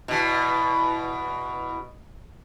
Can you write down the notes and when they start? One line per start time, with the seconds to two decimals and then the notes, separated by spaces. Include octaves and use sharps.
0.08 E2 B2